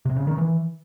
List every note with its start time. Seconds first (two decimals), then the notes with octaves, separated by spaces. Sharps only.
0.05 C3
0.16 C#3
0.27 D#3
0.38 E3